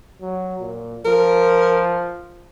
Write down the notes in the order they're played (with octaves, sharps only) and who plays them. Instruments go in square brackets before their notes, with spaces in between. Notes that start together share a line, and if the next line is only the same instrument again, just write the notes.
[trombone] F#3
A#2
[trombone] F3 [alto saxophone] A#4